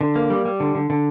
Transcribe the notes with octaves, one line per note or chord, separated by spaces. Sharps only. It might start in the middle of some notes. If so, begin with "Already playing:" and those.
D3
A#3
G3
G3
D3
D3
D3